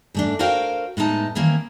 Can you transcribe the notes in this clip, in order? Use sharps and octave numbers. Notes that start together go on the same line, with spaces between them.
G#2 A3 D4
F#4 A#4 C5 C#5 F5 G5
A2 G#3 B3 D#4 A5
D#3 E3 A#3 C4 C#4